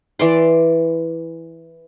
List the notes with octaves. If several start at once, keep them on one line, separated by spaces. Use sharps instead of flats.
E3 D5 C6